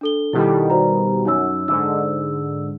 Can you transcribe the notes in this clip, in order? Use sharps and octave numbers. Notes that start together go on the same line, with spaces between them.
D4 A4 G7
B2 D#3 G3 E4 G4 A4
F#4 C5 A#5
F#2 D#4 C#5 E6
G#2 D3 E6